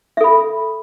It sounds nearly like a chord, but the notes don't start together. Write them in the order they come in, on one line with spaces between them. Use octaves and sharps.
E5 A4 B5